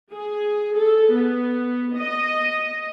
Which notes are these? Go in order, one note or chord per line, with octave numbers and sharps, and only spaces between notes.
G#4
A4
B3
D#5